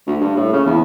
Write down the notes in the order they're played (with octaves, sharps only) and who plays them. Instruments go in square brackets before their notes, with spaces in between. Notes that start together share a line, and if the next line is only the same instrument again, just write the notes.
[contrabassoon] D2
G2
A2
C#3
E2